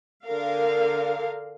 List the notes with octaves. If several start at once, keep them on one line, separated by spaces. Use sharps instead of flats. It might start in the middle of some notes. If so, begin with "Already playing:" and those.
D3 A#4 F5